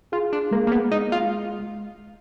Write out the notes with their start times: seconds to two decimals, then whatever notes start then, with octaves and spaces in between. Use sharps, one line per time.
0.12 F4 G#4
0.33 D4
0.51 G#3 A#3
0.67 A#3
0.72 B3
0.91 G#3 D#4
1.12 F4